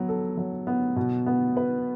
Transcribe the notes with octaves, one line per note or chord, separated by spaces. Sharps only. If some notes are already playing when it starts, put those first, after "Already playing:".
Already playing: F#3 B3
A4
F#3
B3
B2
B3
B4